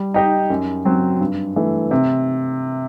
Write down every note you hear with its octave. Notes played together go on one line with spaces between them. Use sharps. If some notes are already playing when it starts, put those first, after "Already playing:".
Already playing: G3
D#4 G4 D#5
F#2
F#3 C4
G2
E3 A3
C3